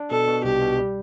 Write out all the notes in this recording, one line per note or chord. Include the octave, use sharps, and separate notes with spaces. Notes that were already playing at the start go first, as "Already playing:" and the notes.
Already playing: D4
B2 A4
B2
C2 G4
B2
G3